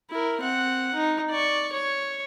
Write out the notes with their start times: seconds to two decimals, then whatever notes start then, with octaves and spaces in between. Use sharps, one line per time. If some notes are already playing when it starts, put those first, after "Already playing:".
0.10 E4 A#4
0.41 C4 F#5
0.94 D#4
1.30 D5 C#6
1.73 C#5